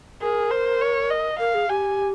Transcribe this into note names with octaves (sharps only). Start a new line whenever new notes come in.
G#4 A#4
C5
C#5
D#5
A#4 F5
G#4
G4 G#5